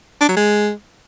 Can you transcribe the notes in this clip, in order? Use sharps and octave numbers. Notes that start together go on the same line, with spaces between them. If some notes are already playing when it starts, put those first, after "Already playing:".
D4
F#3
G#3